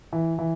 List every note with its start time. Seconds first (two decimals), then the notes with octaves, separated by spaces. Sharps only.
0.13 E3
0.39 E3